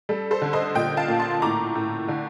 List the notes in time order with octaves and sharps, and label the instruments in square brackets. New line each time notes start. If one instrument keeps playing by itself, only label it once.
[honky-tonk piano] G3 A4
A4 C5
D3
C5 D#5
A#2 D#5 G5
F5 A5
A#2
A5 C6
A2 A#5 D6
A2
D3